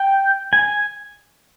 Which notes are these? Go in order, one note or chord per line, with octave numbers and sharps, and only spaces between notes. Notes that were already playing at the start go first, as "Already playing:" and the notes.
Already playing: G5
G#5